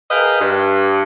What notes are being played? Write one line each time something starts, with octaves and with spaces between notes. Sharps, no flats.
G#4 A#4 B4 D#5 F5 G5
G2